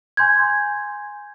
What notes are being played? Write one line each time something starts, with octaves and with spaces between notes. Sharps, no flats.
G#5 C6 G6 G#6